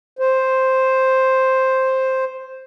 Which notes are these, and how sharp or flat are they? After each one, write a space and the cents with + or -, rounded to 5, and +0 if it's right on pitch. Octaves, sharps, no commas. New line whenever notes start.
C5 +5